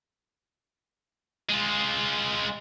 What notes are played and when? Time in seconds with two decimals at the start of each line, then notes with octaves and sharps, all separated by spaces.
1.50 G#3 F4